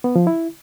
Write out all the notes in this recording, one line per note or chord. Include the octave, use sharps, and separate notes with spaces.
B3
F3
E4